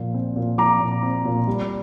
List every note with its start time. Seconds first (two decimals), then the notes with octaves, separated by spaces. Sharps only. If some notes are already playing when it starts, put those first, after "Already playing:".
Already playing: A#2 F3
0.14 C4
0.36 A#2
0.58 F3 A#5 D6
0.80 A#2
1.03 C4
1.25 A#2
1.47 G3